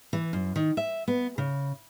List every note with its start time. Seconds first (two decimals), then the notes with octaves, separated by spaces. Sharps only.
0.13 E3
0.33 F#2
0.56 D#3
0.77 E5
1.08 B3
1.38 C#3